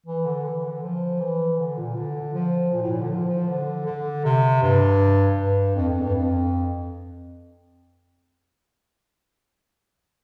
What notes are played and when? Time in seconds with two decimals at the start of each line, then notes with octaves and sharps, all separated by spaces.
0.06 E3
0.26 D3
0.45 E3
0.64 D3
0.83 F3
1.20 E3
1.59 D3
1.77 A#2
1.96 D3
2.34 F3
2.73 A#2
2.82 A2
2.91 A#2
3.01 D3
3.10 F3
3.29 F3
3.49 D3
3.86 D3
4.25 C3
4.63 G2
5.38 G2
5.76 F2
5.89 F2
6.02 G2
6.14 F2